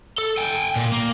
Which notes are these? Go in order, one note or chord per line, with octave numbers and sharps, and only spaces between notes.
A4
G5 G#5
A#2
A#3